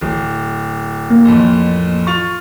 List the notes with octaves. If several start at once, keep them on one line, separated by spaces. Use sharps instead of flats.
D1
A#3
A1 F2
F4 C#6 A6 F7